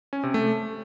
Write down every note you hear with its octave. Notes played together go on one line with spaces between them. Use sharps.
C#4
C3
A3